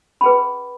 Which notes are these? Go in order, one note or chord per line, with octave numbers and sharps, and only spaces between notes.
C#4 G#4 B4 B5